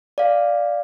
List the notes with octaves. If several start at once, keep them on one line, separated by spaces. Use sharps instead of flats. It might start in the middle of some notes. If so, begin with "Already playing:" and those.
D5 F5